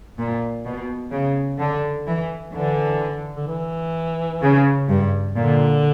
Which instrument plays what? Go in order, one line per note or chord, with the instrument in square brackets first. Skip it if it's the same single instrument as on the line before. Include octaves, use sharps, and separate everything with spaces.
[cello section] A#2
B2
C#3
D3
E3
[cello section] D3 [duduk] E3
[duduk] D3
E3
[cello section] C#3
G2
[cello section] A#2 [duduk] D3